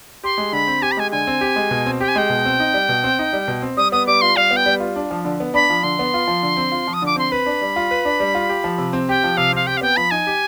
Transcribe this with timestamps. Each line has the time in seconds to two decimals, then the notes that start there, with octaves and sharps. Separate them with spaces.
0.24 G4 C6
0.38 G#3
0.53 D3 B5
0.67 C4
0.82 G4 G#5
0.92 B5
0.97 G#3 G#5
1.11 D3 G#5
1.27 C4
1.41 G4
1.56 G#3
1.71 B2
1.86 C4
2.00 G4 G5
2.08 G#5
2.16 G#3 G5
2.30 B2
2.45 C4
2.60 D#4
2.74 G3
2.89 B2
3.04 C4
3.19 D#4
3.33 G3
3.48 B2
3.62 C4
3.77 G3 D#6
3.92 B3 D#6
4.07 G3 D6
4.21 F4 C6
4.36 G3 F5
4.51 B3
4.57 G5
4.66 G3
4.80 F4
4.96 D4
5.11 F3
5.25 D3
5.40 B3
5.54 D4 B5
5.70 F3
5.83 D3 C6
5.99 B3
6.14 F4
6.27 F3
6.43 D3
6.57 C4
6.72 F4
6.87 F3
6.93 D#6
7.02 D3 D6
7.16 C4 C6
7.32 B4 B5
7.46 D4
7.61 G3
7.76 F4
7.91 B4
8.05 D4
8.20 G3
8.35 F4
8.49 G4
8.64 F3
8.78 C3
8.93 C4
9.09 G4 G5
9.24 F3
9.37 C3 F5
9.53 C4 F5
9.67 G4 G5
9.77 F5
9.81 B3 G5
9.97 F3 B5
10.11 D#4 G#5
10.27 G4